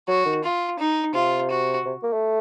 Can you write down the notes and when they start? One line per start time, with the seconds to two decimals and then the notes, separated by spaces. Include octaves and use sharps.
0.08 F#3 F#4
0.26 D#3
0.44 F4
0.79 D#4
1.14 C3 F4
1.51 F#4
1.85 C3
2.03 A#3
2.13 A3